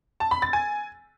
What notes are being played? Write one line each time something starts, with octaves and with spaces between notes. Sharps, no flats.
A5
B5
A6
G#5